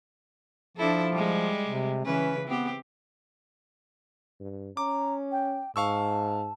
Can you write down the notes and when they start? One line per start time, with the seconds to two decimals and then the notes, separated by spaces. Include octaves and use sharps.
0.77 F3 D4 E4 A4
1.12 G3 G#3
1.64 C3
2.05 C#3 E3 C#4 B4
2.48 B3 C4 G4
4.40 G2
4.77 C#4 A#5 D6
5.32 G5
5.76 G#2 F5 A5 C#6 E6